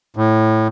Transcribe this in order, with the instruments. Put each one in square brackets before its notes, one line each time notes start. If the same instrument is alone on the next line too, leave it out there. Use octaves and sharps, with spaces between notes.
[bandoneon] A2